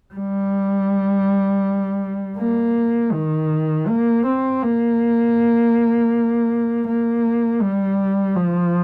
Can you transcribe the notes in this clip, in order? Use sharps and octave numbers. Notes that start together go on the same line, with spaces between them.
G3
A#3
D#3
A#3
C4
A#3
A#3
G3
F3